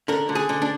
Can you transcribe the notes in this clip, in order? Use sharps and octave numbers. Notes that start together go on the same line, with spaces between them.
D3 A#4
D3
G#4
D3
D4